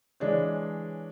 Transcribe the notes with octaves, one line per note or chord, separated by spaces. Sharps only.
E3 G#3 D4 C#5